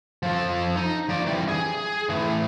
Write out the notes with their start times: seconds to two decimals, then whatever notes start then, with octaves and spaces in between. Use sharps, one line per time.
0.23 F3 A4
0.77 D#4
1.09 F3 D5
1.26 E3 G3
1.49 G#4
2.09 A2 E3